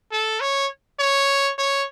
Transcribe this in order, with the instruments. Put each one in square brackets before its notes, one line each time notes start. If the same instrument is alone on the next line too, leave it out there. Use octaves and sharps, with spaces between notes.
[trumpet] A4
C#5
C#5
C#5